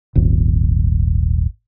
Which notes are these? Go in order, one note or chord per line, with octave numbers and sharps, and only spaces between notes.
D#1 G#1